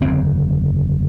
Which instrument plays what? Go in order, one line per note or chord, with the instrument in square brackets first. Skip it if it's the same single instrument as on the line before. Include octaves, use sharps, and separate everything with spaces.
[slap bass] F#1 E2 D3 C4